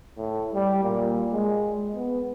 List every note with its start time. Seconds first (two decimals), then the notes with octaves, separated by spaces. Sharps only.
0.17 A2
0.54 G3
0.83 A#2
1.33 G#3
1.95 B3